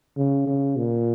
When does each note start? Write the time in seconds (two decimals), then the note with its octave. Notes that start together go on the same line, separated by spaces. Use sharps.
0.17 C#3
0.47 C#3
0.77 A#2